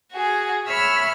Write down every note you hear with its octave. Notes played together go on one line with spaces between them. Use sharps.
F#4 G#4
C#5 E5 B5 E6 F6